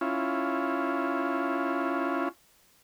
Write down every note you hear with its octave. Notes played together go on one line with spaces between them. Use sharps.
C#4 E4 F4